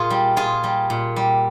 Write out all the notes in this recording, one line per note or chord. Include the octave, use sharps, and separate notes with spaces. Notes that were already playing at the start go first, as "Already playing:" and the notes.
Already playing: A#2 F4 G#4
G3
A#2 F4 G#4
G3
A#2
G3